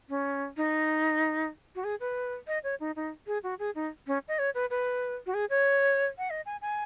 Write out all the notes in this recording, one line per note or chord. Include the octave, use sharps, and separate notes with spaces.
C#4
D#4
F#4
G#4
B4
D#5
C#5
D#4
D#4
G#4
F#4
G#4
D#4
C#4
D#5
C#5
B4
B4
F#4
G#4
C#5
F#5
D#5
G#5
G#5